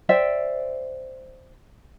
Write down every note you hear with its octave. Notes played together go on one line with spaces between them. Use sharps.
C5 D5 E5 G5